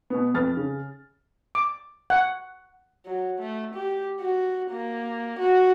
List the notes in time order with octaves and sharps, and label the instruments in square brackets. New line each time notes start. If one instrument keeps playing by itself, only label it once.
[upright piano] B2 B3
F2 B4 F6 A6
C#3
[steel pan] D6
F#5
[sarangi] F#3
A3
G4
F#4
A#3
F#4